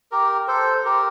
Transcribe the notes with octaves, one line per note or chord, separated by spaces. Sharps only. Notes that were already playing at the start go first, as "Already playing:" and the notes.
G4 A#4
A4 C5
G4 A#4